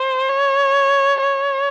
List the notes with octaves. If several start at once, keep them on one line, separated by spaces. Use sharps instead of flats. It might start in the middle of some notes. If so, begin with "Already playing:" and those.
Already playing: C5
C#5
C#5